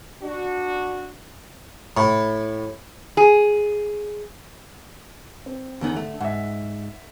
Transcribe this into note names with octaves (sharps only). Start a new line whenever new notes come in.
D4 F#4
A2
G#4
C4
E2 D3 D#3 B3
A3
G#2 E5 F#5